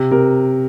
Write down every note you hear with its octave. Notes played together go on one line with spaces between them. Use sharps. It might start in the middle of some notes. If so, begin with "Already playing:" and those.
Already playing: C3
C3 A#4